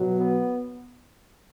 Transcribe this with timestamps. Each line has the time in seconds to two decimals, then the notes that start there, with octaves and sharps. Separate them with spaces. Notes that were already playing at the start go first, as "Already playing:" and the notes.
Already playing: B2 F#3
0.18 B3